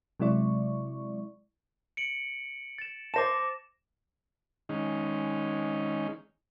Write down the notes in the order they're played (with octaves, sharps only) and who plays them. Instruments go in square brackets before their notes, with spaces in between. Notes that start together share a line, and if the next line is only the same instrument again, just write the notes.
[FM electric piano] C3 F#3 G#3 E4 D5 C#6
[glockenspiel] C#7 D7 F#7
A6 E7
[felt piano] C5 A5 [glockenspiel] D6 A#6 E7
[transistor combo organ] D#3 G#3 C#4 D#4